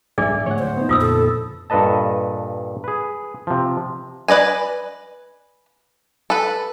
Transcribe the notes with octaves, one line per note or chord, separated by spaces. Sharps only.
G#2 F3 G3 D4 G#4 D5 E5 D6
A2 D3 F3 C#5 F#5
C5
B3 D#4
F2 A#2 D3 F4 D#6 E6
A4
G2 A#2 A4 B4 D#5 A5
G#4 B4
C3 F3
B4 D5 D#5 G#5
A4 B4